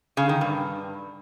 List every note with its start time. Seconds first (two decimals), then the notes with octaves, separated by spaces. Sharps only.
0.17 C#3
0.29 D#3
0.41 G2